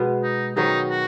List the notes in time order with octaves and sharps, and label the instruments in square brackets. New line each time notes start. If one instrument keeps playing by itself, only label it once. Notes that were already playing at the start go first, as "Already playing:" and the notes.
Already playing: [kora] B2 G#3 B3 G#4
[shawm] D#4
[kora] D#3 F#3 B3 G#4 [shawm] D#4
[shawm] F#4